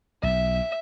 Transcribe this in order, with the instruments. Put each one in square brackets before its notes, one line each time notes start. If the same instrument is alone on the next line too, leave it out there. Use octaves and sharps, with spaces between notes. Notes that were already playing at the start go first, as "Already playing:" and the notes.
[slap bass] B1 [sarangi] E5